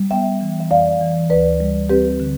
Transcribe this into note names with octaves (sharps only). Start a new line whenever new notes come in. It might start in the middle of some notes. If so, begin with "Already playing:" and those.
Already playing: G3
B3 E5 G5
E3
E5
F2 D5 F5
E3
D2 B4 D5
G3
C4 G4 B4
D3